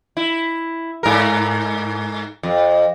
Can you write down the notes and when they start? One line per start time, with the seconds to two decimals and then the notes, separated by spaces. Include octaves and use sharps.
0.17 E4
1.03 G#2 A#4
2.43 F2